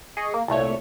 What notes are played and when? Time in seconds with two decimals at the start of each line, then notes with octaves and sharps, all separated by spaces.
0.17 G#4 D#5 C#6
0.34 A#3
0.48 C2 A#2 A3 C#5